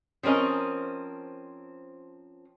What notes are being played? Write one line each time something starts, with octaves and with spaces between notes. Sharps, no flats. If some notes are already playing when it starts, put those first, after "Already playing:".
F3 C4 C#4 A#4 D#5